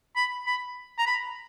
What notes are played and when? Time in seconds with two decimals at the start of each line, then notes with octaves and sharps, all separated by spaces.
0.16 B5
0.47 B5
0.99 A#5
1.06 B5